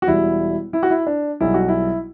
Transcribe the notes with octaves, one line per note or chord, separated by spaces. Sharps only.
F#4
E1 E2 B2 G3 E4
E4
F#4
E4
D4
B1 B2 G3 E4
F#4
E4